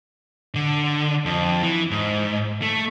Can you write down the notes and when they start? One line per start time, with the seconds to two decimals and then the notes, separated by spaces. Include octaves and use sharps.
0.55 D3
1.25 F2
1.62 E3
1.91 G#2
2.62 A3